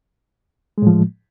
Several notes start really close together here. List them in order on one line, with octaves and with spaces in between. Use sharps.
G#3 A2 F3